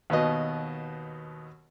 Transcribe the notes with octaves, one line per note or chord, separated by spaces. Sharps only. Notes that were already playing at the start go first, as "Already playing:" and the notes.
D#2 B2 B3 D#5